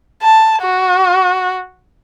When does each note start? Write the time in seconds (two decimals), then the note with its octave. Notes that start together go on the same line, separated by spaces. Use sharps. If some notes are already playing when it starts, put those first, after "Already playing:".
0.22 A5
0.62 F#4